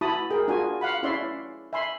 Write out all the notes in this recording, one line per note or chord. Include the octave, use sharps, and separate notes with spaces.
E4 F#4 A5 B5 D#6
G#4 A#4 G5
D4 F4 F#4 G#5
F5 F#5 B5
C#4 E4 C#5 D5 E5 C6
E5 G#5 B5 C6